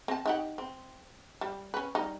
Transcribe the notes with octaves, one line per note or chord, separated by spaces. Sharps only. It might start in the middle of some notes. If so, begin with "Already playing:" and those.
C4 A5
D#4 G4 F#5
C4
G3
C#4 B4
G3 D#4